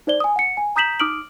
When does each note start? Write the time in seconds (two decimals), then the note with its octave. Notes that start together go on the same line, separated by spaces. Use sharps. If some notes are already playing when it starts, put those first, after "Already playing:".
0.07 D#4 C5 D5 G7
0.20 G#5 D#6
0.36 F#5 C#7
0.57 G#5
0.76 A#5 D#6 G6 B6 E7 F#7
1.00 D#4 D6 D#6 F6 D7 F#7